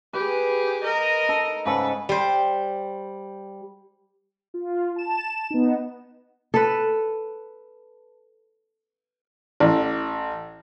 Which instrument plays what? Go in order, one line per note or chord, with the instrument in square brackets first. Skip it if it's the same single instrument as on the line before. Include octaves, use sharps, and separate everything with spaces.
[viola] G4 G#4 [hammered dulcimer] B4
[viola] A#4 D#5
[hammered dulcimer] D#4 A4
[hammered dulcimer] G#2 C#3 A4 [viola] B4
[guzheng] G3 C5
[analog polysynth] F4
A5 E7
B3 D#4
[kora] A4 B4
[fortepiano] A1